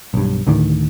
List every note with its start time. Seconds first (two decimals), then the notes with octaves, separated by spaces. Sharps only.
0.14 B1 G2
0.47 D2 A2 D3 D#3